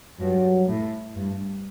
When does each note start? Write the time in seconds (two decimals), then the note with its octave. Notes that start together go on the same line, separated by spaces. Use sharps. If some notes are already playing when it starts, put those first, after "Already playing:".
0.20 G2 F#3
0.68 A2
1.16 G2